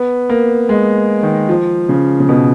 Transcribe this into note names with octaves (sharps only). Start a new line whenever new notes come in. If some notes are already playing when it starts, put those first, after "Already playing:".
Already playing: B3
A#3
G#3
D#3
F3
C#3
C#3
B2